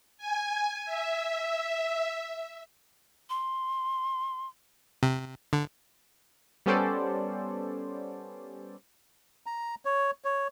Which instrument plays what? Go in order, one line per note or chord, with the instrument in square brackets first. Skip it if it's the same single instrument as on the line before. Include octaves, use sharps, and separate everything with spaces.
[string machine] G#5
E5
[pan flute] C6
[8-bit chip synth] C3
D3
[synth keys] G3 B3 C#4 A4 C5 D5
[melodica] A#5
C#5
C#5